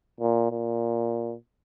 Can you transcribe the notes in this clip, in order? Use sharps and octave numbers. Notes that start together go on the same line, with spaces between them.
A#2
A#2